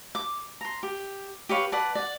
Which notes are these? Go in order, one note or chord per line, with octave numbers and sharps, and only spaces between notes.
D6
A#5 C6
G4
G4 B4 C#5 F5
B4 D5 F#5 A5
D5 F#5